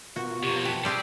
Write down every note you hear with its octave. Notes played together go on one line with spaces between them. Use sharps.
B2 F4 F#4 A#4
F2 C3 G4 C#6
B4 G5 A5
G3 C4 G#4 D5